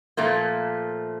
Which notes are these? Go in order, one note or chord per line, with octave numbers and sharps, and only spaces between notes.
A#2 F3 A3 A#3